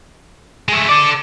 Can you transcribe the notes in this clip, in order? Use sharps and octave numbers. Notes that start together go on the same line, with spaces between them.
G#3 A3
A4 D5 D6